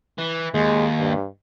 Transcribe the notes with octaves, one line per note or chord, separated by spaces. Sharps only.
E3
D#2 G#3
G2